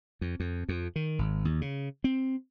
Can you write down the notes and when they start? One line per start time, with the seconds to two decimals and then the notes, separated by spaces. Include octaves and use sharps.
0.21 F2
0.40 F2
0.69 F2
0.96 D#3
1.19 G#1
1.45 D#2
1.61 C#3
2.04 C4